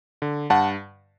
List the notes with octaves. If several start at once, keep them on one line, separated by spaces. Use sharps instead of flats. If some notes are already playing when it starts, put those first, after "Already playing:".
D3
G2 F#5 A5